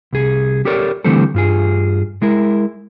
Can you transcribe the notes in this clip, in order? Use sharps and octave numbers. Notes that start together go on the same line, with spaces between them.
C2 G#4
G4 A4 A#4 C#5 D5
D3 E3 G3 A3 C4 A4
G2 F4 G#4
G#3 E4 A#4